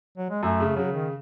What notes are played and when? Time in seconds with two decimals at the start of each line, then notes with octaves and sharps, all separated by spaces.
0.18 F#3
0.30 G#3
0.43 F#2 A3
0.60 C#3
0.76 C#3 F#3
0.93 D#3